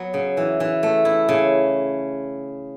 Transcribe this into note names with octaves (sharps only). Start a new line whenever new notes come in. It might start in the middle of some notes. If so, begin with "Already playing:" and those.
Already playing: F#3 B3
C#3
E3
E3
A3
E4
C#3